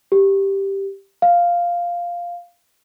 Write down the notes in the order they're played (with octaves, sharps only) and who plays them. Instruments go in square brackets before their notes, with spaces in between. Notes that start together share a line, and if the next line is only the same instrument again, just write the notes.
[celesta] G4
F5